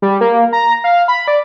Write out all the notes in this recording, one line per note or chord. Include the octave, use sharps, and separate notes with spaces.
G3
A#3
A#5
F5
B5
D5